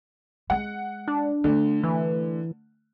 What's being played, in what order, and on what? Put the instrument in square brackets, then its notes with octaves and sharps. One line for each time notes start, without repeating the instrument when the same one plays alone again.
[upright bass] G#3 [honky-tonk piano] F#5
[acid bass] D4
[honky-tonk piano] D3 [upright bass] A3
[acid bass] E3